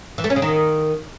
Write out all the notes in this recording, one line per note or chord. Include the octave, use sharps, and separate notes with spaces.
E3
A3
C#4
C#3
D#3